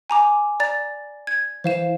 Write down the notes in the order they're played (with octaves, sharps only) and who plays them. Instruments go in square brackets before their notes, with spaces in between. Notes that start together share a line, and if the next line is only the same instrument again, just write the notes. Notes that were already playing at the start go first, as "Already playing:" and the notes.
[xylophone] G#5 A#5 D6
D5 A#5 A6
G#6
[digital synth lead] E3 [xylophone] C5 F5 E7